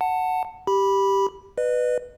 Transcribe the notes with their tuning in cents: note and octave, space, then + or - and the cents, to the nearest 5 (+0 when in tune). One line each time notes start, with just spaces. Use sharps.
F#5 +0 A5 +20
G4 +0 B5 -10
B4 +0 D#5 -40